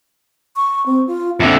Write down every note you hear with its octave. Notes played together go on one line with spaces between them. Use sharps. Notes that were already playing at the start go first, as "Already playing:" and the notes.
C#6
C4
F4
F2 D3 E5